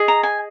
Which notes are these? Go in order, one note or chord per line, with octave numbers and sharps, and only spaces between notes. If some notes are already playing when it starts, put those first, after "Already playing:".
Already playing: G#4 D#5
A#5
G#5